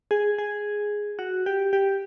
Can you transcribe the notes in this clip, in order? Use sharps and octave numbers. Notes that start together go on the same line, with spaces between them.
G#4
G#4
F#4
G4
G4